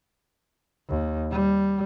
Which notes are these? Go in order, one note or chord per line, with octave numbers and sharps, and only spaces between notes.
D#2
G3